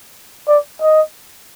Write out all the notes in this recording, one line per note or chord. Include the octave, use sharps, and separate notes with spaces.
D5
D#5